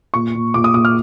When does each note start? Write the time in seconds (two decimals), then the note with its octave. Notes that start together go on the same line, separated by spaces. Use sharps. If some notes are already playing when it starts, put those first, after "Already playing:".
0.14 A#2 C#6
0.34 A#2
0.54 A#2 D6
0.64 D#6
0.74 A#2 D#6
0.85 F6